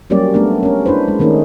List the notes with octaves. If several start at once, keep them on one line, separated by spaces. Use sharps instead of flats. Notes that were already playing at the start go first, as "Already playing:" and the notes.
F#3 G3 A#3 C#4 G4 D5
A3 B3 D4 A#4
C#4 A#4
D4 E4 B4 C5
G#3
D#3 A3 A#3 C#4 D#4